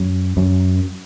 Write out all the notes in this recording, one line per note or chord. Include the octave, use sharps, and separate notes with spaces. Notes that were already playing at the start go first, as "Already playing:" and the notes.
Already playing: F#2
F#2